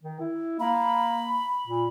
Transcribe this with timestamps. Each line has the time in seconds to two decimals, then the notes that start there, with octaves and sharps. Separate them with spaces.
0.03 D#3
0.20 E4
0.60 A#3 B5
1.67 A#2